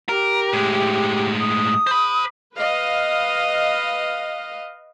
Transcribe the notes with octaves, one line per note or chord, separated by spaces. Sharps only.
G4 A#4
A2 G#3
D#6
C5 B5
B4 D#5 F5